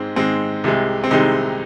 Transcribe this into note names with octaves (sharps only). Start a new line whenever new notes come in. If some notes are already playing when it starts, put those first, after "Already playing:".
Already playing: G#2 G#3 C4
G#2 G#3 C4
C2 C3 G#3
C4
C2 C3 G#3 D#4